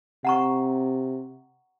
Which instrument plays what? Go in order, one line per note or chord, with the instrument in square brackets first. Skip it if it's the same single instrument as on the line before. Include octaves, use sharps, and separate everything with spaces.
[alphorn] C3 [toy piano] F#5 A#5 C#6